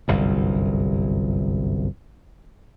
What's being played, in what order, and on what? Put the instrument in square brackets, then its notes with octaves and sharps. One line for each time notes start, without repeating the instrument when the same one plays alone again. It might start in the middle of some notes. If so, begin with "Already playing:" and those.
[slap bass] G1 C2 F#2